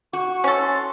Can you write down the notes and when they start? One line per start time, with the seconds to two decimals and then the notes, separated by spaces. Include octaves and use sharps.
0.13 F#4 C#6
0.44 C#4 A4
0.61 C6